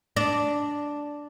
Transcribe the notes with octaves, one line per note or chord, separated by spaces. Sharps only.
D4